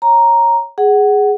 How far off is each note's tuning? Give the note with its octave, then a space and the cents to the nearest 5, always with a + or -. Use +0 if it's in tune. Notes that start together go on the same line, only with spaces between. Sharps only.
C#5 -10 A#5 +0
G#4 +0 F#5 +15